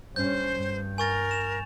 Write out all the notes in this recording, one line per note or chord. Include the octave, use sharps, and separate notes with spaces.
G2 C#4 C5 G6
G2
A#4 G#5 C#6 A6
E7 F7